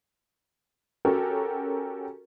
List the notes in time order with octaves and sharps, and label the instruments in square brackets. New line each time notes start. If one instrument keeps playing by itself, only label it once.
[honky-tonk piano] C#4 F#4 G4 A4 A#4